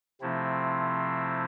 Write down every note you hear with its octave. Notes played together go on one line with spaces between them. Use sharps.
C3 F3 A3 C4 E4